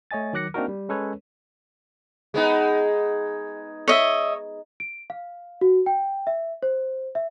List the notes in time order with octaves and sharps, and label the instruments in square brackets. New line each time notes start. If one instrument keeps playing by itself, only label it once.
[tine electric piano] A3 C#5 D#5 G#5 A6
D#3 F#3 D6 F#6 A#6 C#7
A#3 C4 D4 D#4 F#4 A#4
G3
G#3 C#4 A4 B4 C#5
[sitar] G#3 B3 D#4
[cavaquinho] C#5 D#5 E5
[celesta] D7
F5
F#4
G5
E5
C5
E5